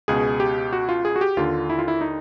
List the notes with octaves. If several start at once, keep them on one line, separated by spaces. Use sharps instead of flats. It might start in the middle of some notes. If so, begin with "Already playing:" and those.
C#2 B2 G#4
G4
F#4
F4
G#4
F#4
G4
D#2 D3 F4
E4
F4
E4
D#4